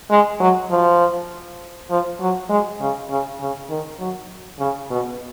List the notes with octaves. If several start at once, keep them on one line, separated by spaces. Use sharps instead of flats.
G#3
F#3
F3
F3
F#3
G#3
C#3
C#3
C#3
D#3
F#3
C#3
B2